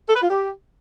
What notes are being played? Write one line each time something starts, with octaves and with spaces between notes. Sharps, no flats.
A4
B4
F4
G4